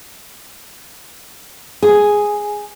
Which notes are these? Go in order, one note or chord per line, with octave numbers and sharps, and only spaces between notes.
G#4